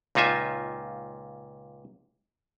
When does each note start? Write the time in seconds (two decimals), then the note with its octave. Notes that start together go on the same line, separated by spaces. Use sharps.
0.15 C#2 A#2 D#4 F4 E5 G#5